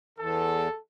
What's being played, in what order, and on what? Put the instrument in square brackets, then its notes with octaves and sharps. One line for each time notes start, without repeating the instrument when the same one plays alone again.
[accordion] E2 [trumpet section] A4